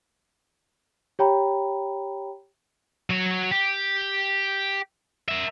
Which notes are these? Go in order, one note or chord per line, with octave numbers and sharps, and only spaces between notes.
G4 C#5 G5 A#5 B5
F#3 C#5
G4
A#4 E5